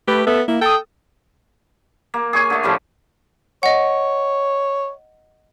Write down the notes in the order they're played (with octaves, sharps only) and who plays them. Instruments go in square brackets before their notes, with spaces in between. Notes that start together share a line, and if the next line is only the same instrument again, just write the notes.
[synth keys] A3 B4 [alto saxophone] G4
[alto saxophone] B3 [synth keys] A4 E5
[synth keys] A#3 [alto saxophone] E4
[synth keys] A4 D#6 [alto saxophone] G5
[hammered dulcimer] A#3
G#4 C#5 G#5
D3 A3
A2 C#3 F3 G3
[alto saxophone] C#5 [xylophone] D#5 F#5